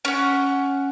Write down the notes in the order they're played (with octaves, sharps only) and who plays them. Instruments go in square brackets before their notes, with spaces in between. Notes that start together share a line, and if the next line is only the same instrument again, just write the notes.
[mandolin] C#4 F#5